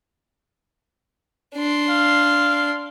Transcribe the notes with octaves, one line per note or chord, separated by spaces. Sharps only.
D4 C6
F5